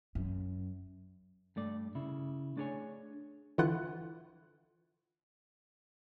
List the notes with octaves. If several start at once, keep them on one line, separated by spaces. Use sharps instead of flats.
F#2
G2 A3 D5
C#3 E4
A3 D4 G#4 A#4 C#5 G#5
D3 E3 E4 F4 F#5 F#6